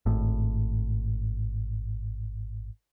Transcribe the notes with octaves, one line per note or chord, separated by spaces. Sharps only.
G#1 A2